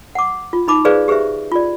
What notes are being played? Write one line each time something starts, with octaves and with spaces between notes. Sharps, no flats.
F#5 D6
F4
D#4 B5 D6
G#4 B4 C5 D5 F5
G4 G#4 B4 C5 E5
F4 D5